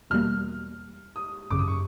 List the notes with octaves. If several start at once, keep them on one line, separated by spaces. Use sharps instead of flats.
E2 B2 G3 A#3 F6
D#6
G#1 F#2 C#3 D6
D#6
C#6